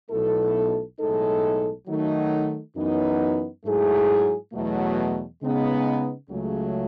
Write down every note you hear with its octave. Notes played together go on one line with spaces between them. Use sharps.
B1 B2 A3 E4 A4
B1 A2 G#3 D#4 A4
D#3 F#3 A3 D#4
F#2 E3 B3 D#4
G#2 F#3 A3 E4 G#4
E2 B2 F#3 A3
C#3 G#3 B3 D#4
C#2 C#3 F#3 A3